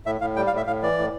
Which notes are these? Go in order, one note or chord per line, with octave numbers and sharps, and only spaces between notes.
A2 E5
A2 F5
G3 G5
F5
A2 E5
A2 F5
E3 D5
A2